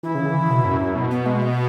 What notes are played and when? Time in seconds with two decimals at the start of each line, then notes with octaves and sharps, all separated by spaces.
0.03 E3 E4
0.15 C#3
0.26 E3
0.37 C#3
0.50 B2
0.65 F#2
0.81 F#2
0.95 B2
1.11 B3
1.26 G#3
1.42 B3